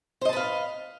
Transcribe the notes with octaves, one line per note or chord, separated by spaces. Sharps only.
B4 C5 D#5 F5 A5